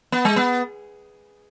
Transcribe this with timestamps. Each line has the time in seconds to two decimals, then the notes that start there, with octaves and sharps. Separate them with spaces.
0.12 B3
0.25 G#3
0.36 B3